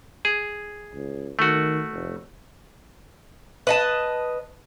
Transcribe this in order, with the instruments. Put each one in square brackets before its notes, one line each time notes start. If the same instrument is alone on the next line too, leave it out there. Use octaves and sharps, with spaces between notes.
[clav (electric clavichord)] G#4
[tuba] C#2
[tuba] D#3 [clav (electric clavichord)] A3 F#4
[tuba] F1
[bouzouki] B4 D#5 A5